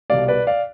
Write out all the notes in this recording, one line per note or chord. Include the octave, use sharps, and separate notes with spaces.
C2 B2 G3 D5 F5
B4 D5
D5 F5